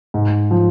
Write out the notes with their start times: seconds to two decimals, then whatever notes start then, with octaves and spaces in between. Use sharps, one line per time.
0.14 G#2
0.51 F3